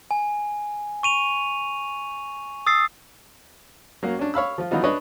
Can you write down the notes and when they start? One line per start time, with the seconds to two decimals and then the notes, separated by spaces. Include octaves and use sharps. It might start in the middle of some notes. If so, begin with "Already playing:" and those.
0.11 G#5
1.03 C#6 D#7 F7
2.67 D#6 E6 A6 C7
4.03 F#3 A#3 C#4
4.19 C#4 D4
4.34 C#5 F5 B5 E6
4.58 F3 F4
4.71 E3 F#3 B3 D#4 F4
4.84 D4 B4 C#5 D#5